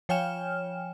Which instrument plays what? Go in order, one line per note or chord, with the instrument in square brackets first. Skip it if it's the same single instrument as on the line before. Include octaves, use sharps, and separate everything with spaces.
[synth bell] F3 C#5 G5 G#5 F6 E7